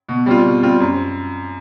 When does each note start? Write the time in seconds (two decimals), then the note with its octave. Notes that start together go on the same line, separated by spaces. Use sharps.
0.09 B2
0.26 G3 C4 F4
0.44 B2
0.62 G3 C4 F4
0.80 F#2